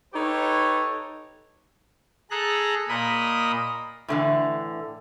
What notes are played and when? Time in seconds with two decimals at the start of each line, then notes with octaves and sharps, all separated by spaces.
0.14 D#4 G4 A4 B4 C#5
2.31 G#4 A4 A#5 F#6
2.88 A#2 A#4 D#5 B5 D#6
4.08 A2 D3 E3